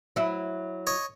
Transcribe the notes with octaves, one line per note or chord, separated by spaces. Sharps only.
F#3 E4
C#5 D#5